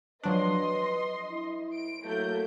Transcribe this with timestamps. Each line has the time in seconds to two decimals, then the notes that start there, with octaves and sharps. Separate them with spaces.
0.23 F3 F#3 D4 B4 D#5 C6
1.31 E4
1.73 D7
2.05 F#3 A3 A#3 G6